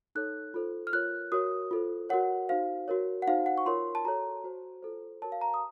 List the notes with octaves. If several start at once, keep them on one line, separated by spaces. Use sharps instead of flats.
D#4 A4 C#5 F#6
F4 A4 C5
F6
F4 A#4 C#5 F#6
F#4 A#4 C#5 D#6
F4 A4 C5
F#4 A#4 C#5 F#5
D#4 F#4 C5 F5
F#4 A#4 C#5
F#5
D#4 F#4 C5 F5
F#5
C#6
F4 A#4 C#5 C6
A5
F#4 A4 C#5 A#5
F#4 C5
F4 A4 C5
F#4 A#4 C#5 A5
F5
A#5
D#6